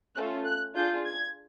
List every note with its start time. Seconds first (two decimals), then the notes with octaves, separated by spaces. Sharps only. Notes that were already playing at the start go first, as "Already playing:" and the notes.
0.16 A3 C#4 F4 A4 F#6
0.45 F#6
0.75 D4 F4 G#4 G6
1.05 G#6